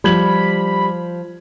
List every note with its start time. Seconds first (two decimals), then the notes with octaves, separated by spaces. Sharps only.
0.04 F3 G3 B5 G#6 F#7